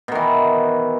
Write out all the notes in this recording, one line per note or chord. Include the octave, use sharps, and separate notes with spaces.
B2 D#3 E3